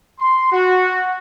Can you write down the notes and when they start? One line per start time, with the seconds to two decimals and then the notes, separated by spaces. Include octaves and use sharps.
0.19 C6
0.52 F#4